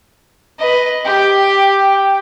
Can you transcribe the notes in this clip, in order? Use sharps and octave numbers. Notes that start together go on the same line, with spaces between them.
B4 D#5
G4 G5